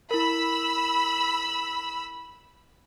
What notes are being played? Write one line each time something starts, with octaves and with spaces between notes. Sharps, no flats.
E4 A#4 B5 E6